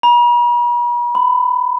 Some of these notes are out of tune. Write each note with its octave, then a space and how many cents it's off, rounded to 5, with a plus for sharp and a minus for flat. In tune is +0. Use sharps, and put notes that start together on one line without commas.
B5 -45
B5 +20